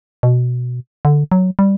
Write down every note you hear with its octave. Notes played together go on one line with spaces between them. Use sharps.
B2
D3
F#3
G3